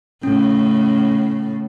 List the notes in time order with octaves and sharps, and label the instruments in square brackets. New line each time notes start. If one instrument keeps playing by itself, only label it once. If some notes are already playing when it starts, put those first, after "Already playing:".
[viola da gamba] A2 C#3 [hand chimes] C#4